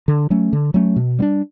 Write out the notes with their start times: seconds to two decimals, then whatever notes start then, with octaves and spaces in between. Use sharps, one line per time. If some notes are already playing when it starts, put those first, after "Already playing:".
0.08 D3
0.30 F#3 A3 C#4
0.53 D3
0.74 F#3 A3 C#4
0.96 B2
1.19 G3 B3 D4